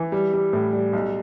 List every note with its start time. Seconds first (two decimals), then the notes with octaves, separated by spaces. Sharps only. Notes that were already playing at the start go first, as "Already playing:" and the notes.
Already playing: E3
0.12 G3
0.33 G3
0.53 A2
0.73 G3
0.93 B1